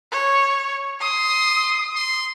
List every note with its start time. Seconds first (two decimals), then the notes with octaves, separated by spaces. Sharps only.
0.12 C#5
1.01 C6 D#6
1.95 C6